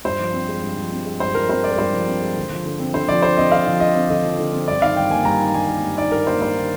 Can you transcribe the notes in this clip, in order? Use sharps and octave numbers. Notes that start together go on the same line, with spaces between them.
G2 C5
F3
C4
G#3
G2
F3
C4
G#3
G2 C5
F3 A#4
C4 C5
G#3 D5
A#4
G2 C5
F3
C4
G#3
D3
F3
D3
C4
D3 C5
F3 D5
D3 C5
C4 D#5
D3 F5
F3
D3 D#5
C4
D3 D#5
F3
D3
C4
G2 D5
D#3 F5
G2 G5
A#3 G#5
G2 A#5
D#3
G2 G#5
A#3
G2
D#3 D5
G2 A#4
A#3 C5
G2 C5
D#3